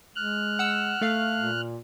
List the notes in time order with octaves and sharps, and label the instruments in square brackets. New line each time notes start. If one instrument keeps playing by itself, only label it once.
[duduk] G#3 [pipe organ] F6 F#6
[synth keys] F#5 E6
A3 F5
[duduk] A#2